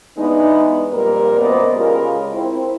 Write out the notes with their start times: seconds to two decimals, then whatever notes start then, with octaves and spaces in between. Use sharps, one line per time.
0.18 E3 G#3 B3 D4 D#4
0.93 F2 A#2 G3 A#3 A#4
1.38 F#2 A#2 B3 C5 D5 D#5
1.76 C#3 G#3 F4 G4 A#4
2.33 C4 E4